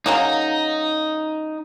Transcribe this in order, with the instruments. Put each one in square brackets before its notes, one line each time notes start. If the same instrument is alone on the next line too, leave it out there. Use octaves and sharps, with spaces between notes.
[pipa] C#3 F#3 A#3 [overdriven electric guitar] D#4